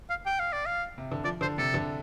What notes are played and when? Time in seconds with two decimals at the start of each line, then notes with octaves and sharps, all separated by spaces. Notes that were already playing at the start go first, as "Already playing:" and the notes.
0.10 F5
0.26 G5
0.39 F5
0.53 D5
0.66 F5
0.98 C3
1.12 D3
1.24 F3 D5
1.41 D3 C5
1.58 C3 A4
1.74 D3